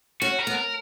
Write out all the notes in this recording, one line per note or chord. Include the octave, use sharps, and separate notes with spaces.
C#4 F#4
A#4
B3
A#4